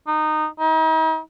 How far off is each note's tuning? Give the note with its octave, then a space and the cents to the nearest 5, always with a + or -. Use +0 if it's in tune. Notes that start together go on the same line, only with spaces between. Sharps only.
D#4 -15
D#4 +40